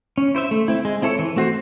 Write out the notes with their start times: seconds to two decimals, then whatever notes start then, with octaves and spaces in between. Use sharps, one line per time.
0.18 C#4
0.35 E4 C5 E5
0.51 A3
0.68 C4 E4
0.85 G#3
1.02 C4 E4 A4 C#5
1.19 E3
1.36 A3 C4 F#4 C5